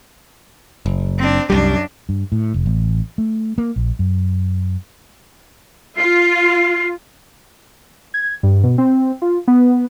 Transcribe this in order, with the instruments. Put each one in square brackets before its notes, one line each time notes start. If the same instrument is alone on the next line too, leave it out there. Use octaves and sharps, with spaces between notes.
[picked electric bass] F#1
[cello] C4 D4
[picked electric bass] C2 G3 [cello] F#2 D4
[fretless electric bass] G2
A2
F1
A1
A3
A#3
A#1
F#2
[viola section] F4 [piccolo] C7
[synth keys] G#6
G2
B2
C4
F4
B3